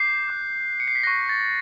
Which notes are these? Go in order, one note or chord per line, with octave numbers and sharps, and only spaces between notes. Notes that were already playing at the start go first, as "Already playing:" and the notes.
Already playing: D6 G6 C7
D6 F#6
C#7
C7
B6
C#6 F#6 A#6
A6